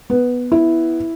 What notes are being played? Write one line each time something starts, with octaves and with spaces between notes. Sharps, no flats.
B3
E4